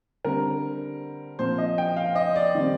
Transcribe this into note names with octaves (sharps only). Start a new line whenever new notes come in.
D3 G3 C4 A#4
A#2 F3 C4 C5
D#5
G5
F5
D#5
D5
D#3 G3 C4